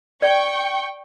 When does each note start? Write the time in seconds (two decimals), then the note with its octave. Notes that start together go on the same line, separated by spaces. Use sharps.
0.22 D5 G5 C#6